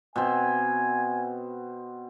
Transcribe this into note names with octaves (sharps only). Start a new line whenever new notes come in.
B2 C4 G#5